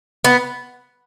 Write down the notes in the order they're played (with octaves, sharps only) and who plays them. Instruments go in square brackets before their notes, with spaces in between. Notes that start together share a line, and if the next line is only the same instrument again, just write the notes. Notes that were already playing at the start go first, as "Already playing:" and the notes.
[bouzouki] B3